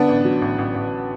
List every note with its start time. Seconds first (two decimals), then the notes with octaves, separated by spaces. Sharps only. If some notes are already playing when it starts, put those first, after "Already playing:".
Already playing: D3 B3 D4
0.08 A1
0.25 F#3
0.42 A1
0.58 A1
0.75 A1